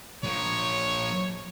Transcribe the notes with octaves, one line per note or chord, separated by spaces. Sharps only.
F3 A#3 C#5